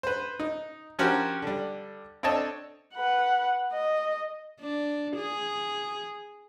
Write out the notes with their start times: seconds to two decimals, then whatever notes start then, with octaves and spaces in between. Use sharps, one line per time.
0.03 B4 C5
0.40 D#4
0.99 F3 C#4 F#4 G4 A#4 C5
1.42 D3 G3
2.23 C4 D4 A4 C#5 D#5 A5
2.95 B4 F#5
3.73 D#5
4.60 D4
5.17 G#4